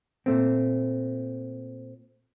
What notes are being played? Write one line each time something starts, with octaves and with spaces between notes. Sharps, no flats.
A#2 A3 C4